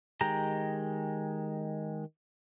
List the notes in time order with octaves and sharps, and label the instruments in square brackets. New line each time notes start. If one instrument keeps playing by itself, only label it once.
[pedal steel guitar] D#3 G#3 G4 G5 A#5